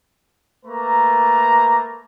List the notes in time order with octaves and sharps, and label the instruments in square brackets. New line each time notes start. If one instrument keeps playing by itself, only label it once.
[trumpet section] A3 A#3 B4 A#5